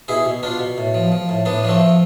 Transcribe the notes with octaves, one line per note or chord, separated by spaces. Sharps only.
B2 E4 G#4
B2
B2 D4 F4
B2
A2
F3
F3
A2
A2 B3 D4
F3 D4
A3 C4
F3